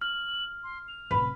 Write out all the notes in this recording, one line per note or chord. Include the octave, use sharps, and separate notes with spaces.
F6 F#7
C6
F7
D1 C3 B4